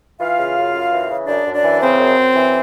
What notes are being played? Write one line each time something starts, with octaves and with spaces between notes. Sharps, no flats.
E3 F4 F5
C#3
F#2
F#2
E3
C#3
F#2 D4 D5
F#2
D4 D5
E3
C#3 C4 C5
F#2
F#2
E3